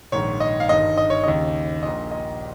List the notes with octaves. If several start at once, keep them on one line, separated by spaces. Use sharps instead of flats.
A#1 G#2 D#3 C#5
D#5
F5
G1 G2 D#3 D#5
D#5
C#5
D#2 C#3 D#5
A#1 A#2 D#5
D#5